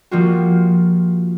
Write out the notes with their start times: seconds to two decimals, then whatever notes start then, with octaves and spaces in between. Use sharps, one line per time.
0.11 F3 G3 A#3 F4 F#4